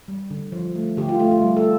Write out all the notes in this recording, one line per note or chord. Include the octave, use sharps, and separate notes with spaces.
G3
D3
F3
A3
D3 G4
F4
A3 F4
F4
G3
A4